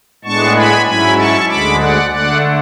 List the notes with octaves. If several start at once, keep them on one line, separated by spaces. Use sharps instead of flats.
A2 G#3 B3 D4 A5 C#6
G#5 B5
G#2 F#3 C#4 E4 G#5 B5
A5 C#6
D2 D3 G#3 B5 D6
D5 F#5
D3 A3 D4 D5 F#5